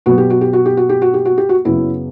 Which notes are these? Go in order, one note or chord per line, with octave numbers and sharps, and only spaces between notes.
B2 F#3 B3 F#4
G4
F#4
G4
F#4
G4
F#4
G4
F#4
G4
F#4
G4
F#4
F#2 C#3 F#3 B3 E4